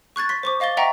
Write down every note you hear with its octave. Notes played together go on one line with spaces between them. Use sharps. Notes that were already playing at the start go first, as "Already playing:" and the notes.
C#6 F#6 G#6 A6
C6 B6
C5 C#6 D6
D#5 F5 D6 A6 G7
D#5 E5 F#5 G5 A#5 C#6